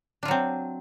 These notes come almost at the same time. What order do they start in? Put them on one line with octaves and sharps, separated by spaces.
D4 F4 F#3 C4